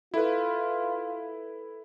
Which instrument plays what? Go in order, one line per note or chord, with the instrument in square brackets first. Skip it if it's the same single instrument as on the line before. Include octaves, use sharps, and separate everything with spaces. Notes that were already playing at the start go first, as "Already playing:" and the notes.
[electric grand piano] E4 B4 [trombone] F4 [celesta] A4